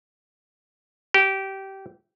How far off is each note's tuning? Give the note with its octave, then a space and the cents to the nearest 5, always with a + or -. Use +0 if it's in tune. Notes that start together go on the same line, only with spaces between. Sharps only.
G4 -20